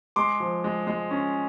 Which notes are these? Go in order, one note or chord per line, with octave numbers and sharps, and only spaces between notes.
G#3 C6 D6
F3
G#3
G#3
C#4